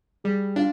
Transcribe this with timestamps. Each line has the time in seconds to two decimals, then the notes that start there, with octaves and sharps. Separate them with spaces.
0.24 G3 G#4
0.56 D4 F4